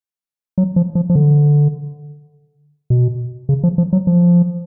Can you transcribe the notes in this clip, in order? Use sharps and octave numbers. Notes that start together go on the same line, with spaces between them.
F#3
F3
F3
F3
D3
B2
C#3
F3
F3
F#3
F3